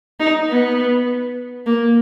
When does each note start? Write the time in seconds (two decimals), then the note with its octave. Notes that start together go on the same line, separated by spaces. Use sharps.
0.20 D#4
0.50 B3
1.66 A#3